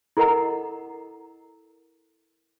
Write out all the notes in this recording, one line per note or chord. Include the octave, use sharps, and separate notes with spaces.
E4 A4 A#4 D#5 F#5 A#5